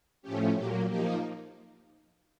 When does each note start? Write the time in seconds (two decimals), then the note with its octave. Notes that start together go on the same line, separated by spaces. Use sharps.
0.22 A2 F3 A3 C#4 G4
0.54 A#2 F#3 A#3 G4
0.87 F3 A#3 D#4 G4